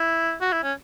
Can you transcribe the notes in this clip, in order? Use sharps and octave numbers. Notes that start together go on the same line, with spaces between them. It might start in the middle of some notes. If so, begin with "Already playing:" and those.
Already playing: E4
F#4
E4
C#4